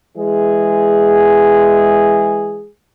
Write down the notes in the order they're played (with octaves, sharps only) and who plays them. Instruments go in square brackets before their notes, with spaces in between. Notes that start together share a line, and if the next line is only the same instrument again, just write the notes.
[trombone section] E3 G#3 G#4